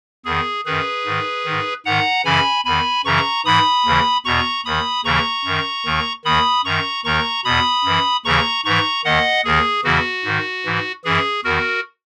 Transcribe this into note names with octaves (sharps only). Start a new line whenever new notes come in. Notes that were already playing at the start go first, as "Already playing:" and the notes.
E2 D#3 G#4
F#2 D#3 G#4 B4
G#2 D#3
D#3
G#2
G#2 D#3 F#5 A#5
F#2 C#3 E3 G#5 B5
E2 D#3 G#5 B5
F#2 C#3 E3 A#5 C#6
G#2 E3 B5 D#6
D#2 C#3 E3
E2 B2 A#5 C#6
D#2 D#3 B5 D#6
D#2 C#3 E3 A#5 C#6
F#2 D#3
D#2 D#3
D#2 D#3 B5 D#6
F#2 D#3 A#5 C#6
D#2 D#3 A#5 C#6
E2 B2 B5 D#6
F#2 E3
D#2 C#3 E3 A#5 C#6
G#2 E3 A#5 C#6
D#2 D#3 D#5 F#5
D#2 D#3 G#4
E2 C#3 E3 F#4
G#2 D#3
G#2 E3
F#2 E3 G#4
E2 D#3 F#4 A#4